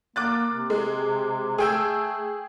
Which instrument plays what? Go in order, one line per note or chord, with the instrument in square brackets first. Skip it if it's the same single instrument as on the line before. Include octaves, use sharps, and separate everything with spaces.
[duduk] A#3 [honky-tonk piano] D6 F#6 A6
[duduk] C3
[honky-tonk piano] G#3
[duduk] A3 [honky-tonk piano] G#4 G5 E6